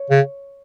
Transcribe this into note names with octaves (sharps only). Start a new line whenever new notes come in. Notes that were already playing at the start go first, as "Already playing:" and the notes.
Already playing: C#5
C#3